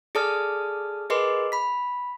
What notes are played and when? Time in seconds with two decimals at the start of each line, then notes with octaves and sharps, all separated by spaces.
0.15 G#4 A4 D5 A5 D#6 F6
1.10 G#4 A#4 B4 D#5 C6 D6
1.52 B5 B6